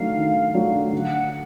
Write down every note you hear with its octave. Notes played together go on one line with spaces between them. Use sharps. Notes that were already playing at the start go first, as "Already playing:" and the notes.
Already playing: D#3 F#3 A3 D4 F5
D#3
F#3 A3 D4
D3 F#5